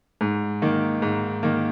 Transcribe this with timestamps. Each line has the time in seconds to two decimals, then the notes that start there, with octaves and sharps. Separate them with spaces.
0.21 G#2
0.62 D#3 A#3
1.02 G#2
1.43 D#3 A#3